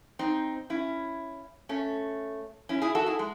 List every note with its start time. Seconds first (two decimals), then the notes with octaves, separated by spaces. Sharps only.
0.19 C4 D#4
0.70 C#4 E4
1.69 A3 C#4
2.69 C#4 E4
2.82 E4 G#4
2.95 F#4 A4
3.06 E4 G#4
3.19 G#3